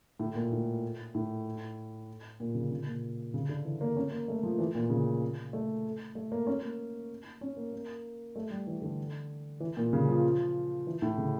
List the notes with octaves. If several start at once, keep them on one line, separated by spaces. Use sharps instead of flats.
A2
A#2
A2
A2
A#2
C#3
C#3
A#2
C#3
D3
E3
A#3
C#4
A#3
A3
F3
E3
A#2
C#3
A3
A3
A#3
C#4
A#3
C#4
A#3
A#3
A3
G3
E3
D3
E3
A#2
C#3
F3
E3
A2
C#3